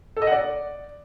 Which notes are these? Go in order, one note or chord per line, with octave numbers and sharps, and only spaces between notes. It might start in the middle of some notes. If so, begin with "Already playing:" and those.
A4
D#5
F#5
D5